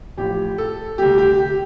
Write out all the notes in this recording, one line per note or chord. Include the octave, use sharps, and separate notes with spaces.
A1 A2 F3 G4
A4
D2 C3 G3 G4
G4
G4